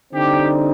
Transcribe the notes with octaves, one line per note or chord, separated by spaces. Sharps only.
D3 G3 C4 D#4 G4